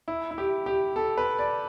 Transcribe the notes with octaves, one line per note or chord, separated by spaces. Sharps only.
E4
E4
G4
G4
A4
B4
D5